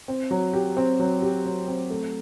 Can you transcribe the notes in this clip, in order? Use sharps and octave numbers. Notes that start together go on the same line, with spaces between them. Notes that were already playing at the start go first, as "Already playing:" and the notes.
C4
F#3
G4
C4
F#3
G4
F#3
C4
A3